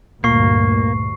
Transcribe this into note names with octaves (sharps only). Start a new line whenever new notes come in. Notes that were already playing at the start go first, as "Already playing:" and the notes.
D2 G2 A#2 A#3 C#6 C7